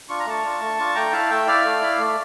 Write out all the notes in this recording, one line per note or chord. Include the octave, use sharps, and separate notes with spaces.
D4 F4 C#6
A#5
A3 A5 C#6
D4 F4
A3
D4 F4
A3 G5 A#5
E4 F5 A5
A3 E5 G5
E4 D5 F5
A3
E4
A3